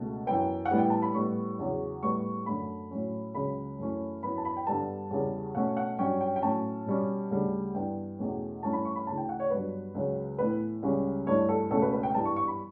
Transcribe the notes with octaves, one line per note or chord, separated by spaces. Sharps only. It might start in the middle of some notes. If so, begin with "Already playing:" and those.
Already playing: C#2 B2 A3
F#2 E3 B3 G5
F#5
A2 E3 G3 B3
G5
A5
B5
A2 G3 B3 C#6
E2 C#3 F#3
A2 G3 B3 C#6
F#2 D3 A3 B5
A2 F#3 C#4
C#2 C#3 F#3 B5
F#2 E3 A3 C#4
F#2 E3 B3 B5
A5
B5
G5
G2 D3 G3 B3 A5
E2 C#3 G3
B2 A3 C#4 F#5
F#5
G2 F#3 C#4 G5
G5
G5
A2 F#3 C#4 A5
B2 G3 C#4
D2 C#3 G3
G2 E3 B3 G5
E2 B2 A3 C#4
G2 E3 A3 C#4 A5
B5
C#6
B5
D2 C#3 E3 A5
G5
F#5
C#5
G2 F#3 B3 B4
C#2 C#3 F#3
A2 E3 B3 B4
C#2 C#3 G3 C#4
G2 E3 A3 C#5
A4
C#2 B2 A3 C#4 A4
B4
B4
G5
G2 E3 G3 B3 A5
C#6
C#6
B5